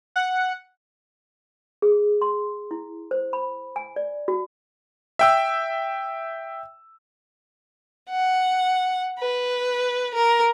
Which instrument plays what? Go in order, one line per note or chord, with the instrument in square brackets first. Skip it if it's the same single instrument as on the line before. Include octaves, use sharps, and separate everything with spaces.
[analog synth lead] F#5
[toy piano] G#4
C6
E4
C5
B5
G#5
D5
F#4
[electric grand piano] E5 G5 E6
[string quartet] F#5
B4
A#4